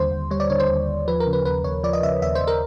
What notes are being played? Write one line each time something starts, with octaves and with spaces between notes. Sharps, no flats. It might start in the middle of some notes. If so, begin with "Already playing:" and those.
Already playing: D#2 D3 G3 C5
D#2
G3 C#5
D5
D3 C#5
C5
D#2
D#2
F3 B4
A#4
C#3
B4
D#2 B4
D#2 C#5
F3 D5
D#5
C#3 E5
D#2 E5
C5
D#2
A#4